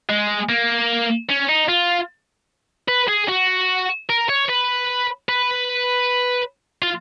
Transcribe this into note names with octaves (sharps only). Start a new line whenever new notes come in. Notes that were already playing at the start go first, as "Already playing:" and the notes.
G#3
A#3
C#4
D#4
F4
B4
G#4
F#4
A#4
C#5
B4
B4
F4